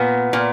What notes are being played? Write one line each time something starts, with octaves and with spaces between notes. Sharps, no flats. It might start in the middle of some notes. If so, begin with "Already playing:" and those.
Already playing: A#2 B3
A#2